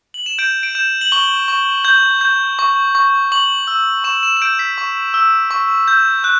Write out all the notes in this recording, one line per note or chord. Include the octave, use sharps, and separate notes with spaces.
F#7
E7
G6 D7
D7
G6 E7
F#7
C#6 G7
C#6
G6
G6
C#6
C#6
C#6 F#7
E6
C#6 E7
E7
E7
G6 D7
B6
C#6
E6
C#6
G6
F#6